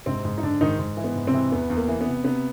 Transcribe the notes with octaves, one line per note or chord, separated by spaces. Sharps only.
G#2 C3 C4
G#2
D#4
G#2 D3 D4
G#2 D#3 D#4
G#2
E3
B3
G#2
C3 C4
E3
E2 B3
E2
A#3
E3
B3
C3
C3 B3